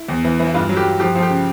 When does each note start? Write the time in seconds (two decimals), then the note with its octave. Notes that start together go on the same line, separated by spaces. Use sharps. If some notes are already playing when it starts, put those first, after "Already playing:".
Already playing: E4
0.09 E2
0.25 E3
0.40 E3
0.47 E4
0.54 G2 F4
0.69 F#3
0.77 G4
0.85 G2
1.00 F3 G4
1.16 F3
1.23 G4
1.30 C#3